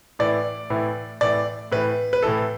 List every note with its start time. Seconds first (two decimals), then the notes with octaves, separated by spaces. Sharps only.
0.19 A2 E3 D5
0.70 A2 E3
1.21 A2 E3 D5
1.72 A2 E3 B4
2.13 B4
2.23 A2 E3 A4